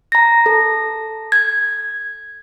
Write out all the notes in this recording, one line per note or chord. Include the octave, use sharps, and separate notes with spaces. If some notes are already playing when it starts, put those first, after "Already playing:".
A#5 A#6
A4
G#6